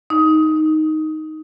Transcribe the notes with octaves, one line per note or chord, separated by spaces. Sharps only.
D#4